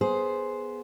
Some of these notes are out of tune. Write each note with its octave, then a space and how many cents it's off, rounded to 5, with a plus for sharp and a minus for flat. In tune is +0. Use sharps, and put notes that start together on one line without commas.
B3 -5 G#4 +10 C5 +0